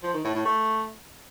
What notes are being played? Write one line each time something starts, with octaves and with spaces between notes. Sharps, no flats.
F3
D#3
A2
A2
A3